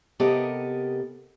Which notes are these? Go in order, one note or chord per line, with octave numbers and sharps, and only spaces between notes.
C3 B3 G4 A4 A#4 D#5